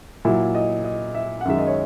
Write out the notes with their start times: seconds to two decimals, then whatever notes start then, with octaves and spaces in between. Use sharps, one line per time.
0.25 A#2 F#3 E4
0.55 D#5
0.84 D#5
1.15 E5
1.41 F#5
1.45 F#2 D#3 G#3 E5
1.58 D#5
1.67 C#5